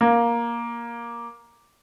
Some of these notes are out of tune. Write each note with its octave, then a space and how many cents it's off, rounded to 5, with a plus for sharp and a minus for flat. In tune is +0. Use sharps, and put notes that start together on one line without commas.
A#3 +10